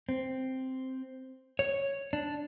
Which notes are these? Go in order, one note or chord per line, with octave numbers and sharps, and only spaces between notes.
C4
C#5
D4